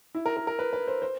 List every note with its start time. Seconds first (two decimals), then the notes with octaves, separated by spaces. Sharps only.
0.15 E4
0.26 A#4
0.37 A#4
0.47 A#4
0.59 B4
0.73 B4
0.87 C5
1.02 C5